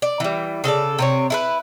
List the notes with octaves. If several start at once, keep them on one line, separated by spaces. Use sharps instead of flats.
D5
E3 G3
C#3 A4 B4 D5
C3 C4 C#5
E4 A4 B4